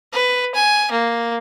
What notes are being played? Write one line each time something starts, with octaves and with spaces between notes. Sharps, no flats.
B4
G#5
A#3